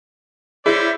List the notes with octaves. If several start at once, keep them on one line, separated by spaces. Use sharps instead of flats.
C#4 E4 G#4 C5 D5